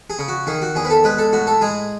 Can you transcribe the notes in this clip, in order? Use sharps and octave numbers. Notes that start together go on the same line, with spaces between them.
G#4
C#3
F#4
D#3 G#4
F#4
E2 G#4
B4
A4
G#3 B4
A4
A2 F#4
A4
G#3 G#4